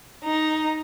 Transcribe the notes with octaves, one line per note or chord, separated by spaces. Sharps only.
D#4